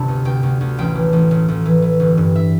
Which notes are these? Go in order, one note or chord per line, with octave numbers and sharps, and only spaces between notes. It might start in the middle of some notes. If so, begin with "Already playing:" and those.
Already playing: G1 C3 A5 B5
D2
D2 G5
D2
D2
A1 G5
E3
A1
A1
A1
E3
E3
G1
G2
E5